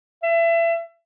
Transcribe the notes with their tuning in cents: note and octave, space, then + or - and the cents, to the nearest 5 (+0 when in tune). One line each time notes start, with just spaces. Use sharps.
E5 +30